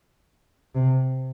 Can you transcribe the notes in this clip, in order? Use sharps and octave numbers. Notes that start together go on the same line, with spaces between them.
C3